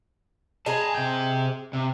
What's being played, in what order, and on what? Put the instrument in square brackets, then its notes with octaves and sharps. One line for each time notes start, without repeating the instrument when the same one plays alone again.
[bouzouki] G#4 D#5 [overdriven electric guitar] A5 A#5
[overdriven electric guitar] C3 G5
C3